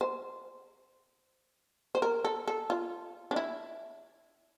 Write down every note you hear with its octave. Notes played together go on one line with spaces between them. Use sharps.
C5
C5
A#4
A4
A4
F4
D4
E4